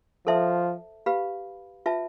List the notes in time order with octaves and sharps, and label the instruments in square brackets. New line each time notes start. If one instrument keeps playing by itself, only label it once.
[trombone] F3 [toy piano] A4 C5 E5 A5
[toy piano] G4 B4 F5 B5
F4 B4 E5 A5